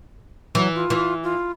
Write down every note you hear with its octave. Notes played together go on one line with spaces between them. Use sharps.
E3 F#3
F4
E3
F4